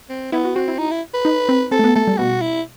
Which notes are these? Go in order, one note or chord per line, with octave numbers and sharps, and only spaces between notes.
C4
B3 E4
F#4
C4 F#4
E4
D#4
E4
B4
D#4
C4
C4 A4
A3
B3
A3 A4
G3
B2 F#4
E4